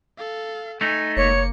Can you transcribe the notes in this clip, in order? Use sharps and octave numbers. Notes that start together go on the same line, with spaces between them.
A4 F5
A3 D#4 G#5
F#1 A#3 C#5 C#7